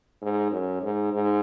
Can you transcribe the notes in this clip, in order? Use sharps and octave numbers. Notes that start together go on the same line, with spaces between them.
G#2
F#2
G#2
G#2